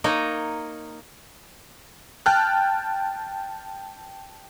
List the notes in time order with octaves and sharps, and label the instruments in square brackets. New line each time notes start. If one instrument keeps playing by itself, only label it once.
[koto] A#3 D#4 C#5 D#5
[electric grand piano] G5 A5 F6 F#6